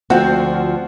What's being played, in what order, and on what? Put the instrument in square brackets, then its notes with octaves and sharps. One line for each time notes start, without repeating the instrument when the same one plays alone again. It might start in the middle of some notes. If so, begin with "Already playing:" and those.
[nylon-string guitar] D2 F3 C4 [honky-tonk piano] F4 F#4